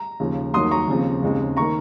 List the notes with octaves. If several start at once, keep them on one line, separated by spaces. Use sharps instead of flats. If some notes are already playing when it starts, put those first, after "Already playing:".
Already playing: A#5
D#2 C#3 F3
D#2 D#3 F#3 A#3 C6 D#6
A#5 C#6
D#2 C#3 F3 C4
D#2 C#3 G#3 C4
D#3 A#3 A#5 C#6